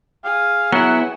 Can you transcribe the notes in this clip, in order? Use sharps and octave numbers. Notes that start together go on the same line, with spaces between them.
G#4 F5
F#3 B3 E4 F#5